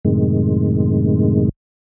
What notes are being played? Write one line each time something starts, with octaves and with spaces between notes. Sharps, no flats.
F#2 A2 C3 D#3 G#3